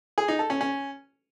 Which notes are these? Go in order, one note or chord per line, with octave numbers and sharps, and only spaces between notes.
G#4
D#4
A4
C#4
C#4